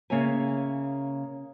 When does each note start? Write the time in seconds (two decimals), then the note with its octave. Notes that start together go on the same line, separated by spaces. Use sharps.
0.10 C#3 A#3 C#5 E5 G#5